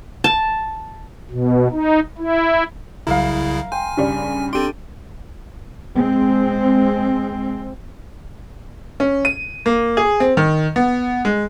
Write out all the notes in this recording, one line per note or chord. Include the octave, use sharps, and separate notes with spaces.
A5
B2
D#4
E4
C2 C#3 F#3 E4 A#4 E5 F5
G5 G#5 C6
G2 C#3 G3
C4 D4 G4 A4 C6 D7 D#7
G#3 C4
C#4
D#7
A#3
G#4
C4
D#3
B3
G#3